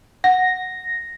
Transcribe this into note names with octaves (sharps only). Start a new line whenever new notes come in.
F#5 A#6